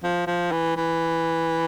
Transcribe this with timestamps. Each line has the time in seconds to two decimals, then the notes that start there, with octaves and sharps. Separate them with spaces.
0.04 F3
0.27 F3
0.52 E3
0.77 E3